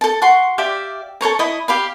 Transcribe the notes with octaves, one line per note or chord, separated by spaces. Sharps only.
A4 A5
F#4 C6
G4 D5 E5 F5
A4 C5 C#5 A#5
E4 D#5
G4 F5 B5